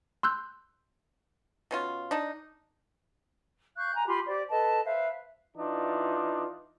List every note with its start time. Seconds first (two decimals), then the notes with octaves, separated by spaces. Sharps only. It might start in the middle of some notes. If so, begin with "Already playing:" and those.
0.23 C6 E6 F#6 G6
1.71 B2 C#4 F4
2.11 D4 D#4
3.77 F5 C#6 F#6 G6
3.94 G#5 A#5
4.06 F4 G4 B5 C6
4.26 G4 C5 D5
4.50 A4 B4 D#5 A5
4.85 B4 C5 E5 F5
5.57 E3 D4 D#4 F4